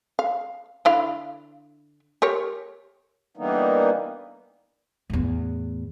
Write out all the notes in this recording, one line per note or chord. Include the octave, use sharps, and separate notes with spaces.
F5
D3 E4 F5
G4 A#4 C#5
D3 E3 G3 A#3 B3 D#4
E2 A2